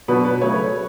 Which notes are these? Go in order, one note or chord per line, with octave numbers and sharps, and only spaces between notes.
B2 F#3 B3 D4 B4
B4
C#3 F#3 A3 C#5